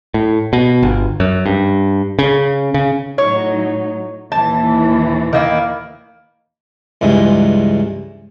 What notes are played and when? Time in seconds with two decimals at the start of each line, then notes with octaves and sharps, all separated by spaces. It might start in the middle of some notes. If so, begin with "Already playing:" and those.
0.14 A2
0.53 B2
0.83 G1
1.20 F#2
1.46 G2
2.19 C#3
2.74 C#3
3.18 A2 F#3 D#4 C#5
4.32 D#2 A#2 E3 A5
5.33 D#3 A#3 E4
7.01 C#2 G2 E3 G#3